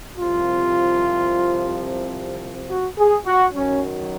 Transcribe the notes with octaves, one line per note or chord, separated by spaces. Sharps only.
C2 C3 F3 F4
F#4
G#4
F#4
F#2 D#3 F#3 C#4